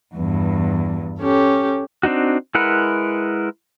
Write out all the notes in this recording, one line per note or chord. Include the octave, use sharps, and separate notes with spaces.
E2 G2
C#4 G4 A4
C4 D4 D#4 F#4
G#3 E4 A#4 B4 F#5